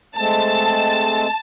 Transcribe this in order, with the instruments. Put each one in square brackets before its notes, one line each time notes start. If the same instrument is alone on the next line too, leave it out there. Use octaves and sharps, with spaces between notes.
[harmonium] G#3 A3 C4 [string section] A5